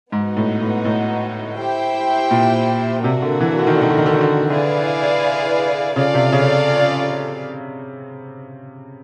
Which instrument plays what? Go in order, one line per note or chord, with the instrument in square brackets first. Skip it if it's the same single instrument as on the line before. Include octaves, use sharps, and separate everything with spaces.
[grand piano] G#2 [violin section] B3 D#4 F#4
[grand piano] A2
A2
A2
[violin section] E4 G4 C5 E5 G5
[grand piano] A#2
[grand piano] C3 [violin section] A#3 D4 F#4 A#4
[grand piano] D3
E3
D3
D#3
D3
D#3
D3
D#3
D3
D#3
D3
[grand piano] D3 [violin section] E4 G#4 B4 D5 F5
[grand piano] C#3 [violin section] C#4 F4 A4 D5 F5
[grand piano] C3
C#3